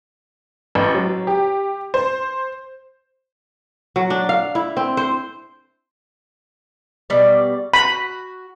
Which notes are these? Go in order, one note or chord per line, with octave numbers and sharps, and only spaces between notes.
A1
F#3
G4
C5
F#3
D4
F5
E4
C4
C5
B2 G3 D5
F#4 B5